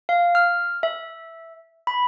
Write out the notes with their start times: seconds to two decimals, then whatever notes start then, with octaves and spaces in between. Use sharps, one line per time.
0.09 F5
0.35 F6
0.83 E5
1.87 B5